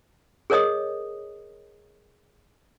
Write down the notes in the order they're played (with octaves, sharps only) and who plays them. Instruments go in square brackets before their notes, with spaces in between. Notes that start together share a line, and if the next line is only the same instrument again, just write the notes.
[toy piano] G#4 A#4 C#5 D#5 D#6